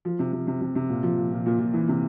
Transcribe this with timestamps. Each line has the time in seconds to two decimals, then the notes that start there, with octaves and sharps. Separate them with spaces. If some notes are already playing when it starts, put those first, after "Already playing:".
0.05 F3
0.19 C3
0.32 C3
0.47 C3
0.61 C3
0.75 C3
0.90 A#2
1.03 F3
1.17 A#2
1.32 A#2
1.46 A#2
1.59 A#2
1.73 E3
1.88 C3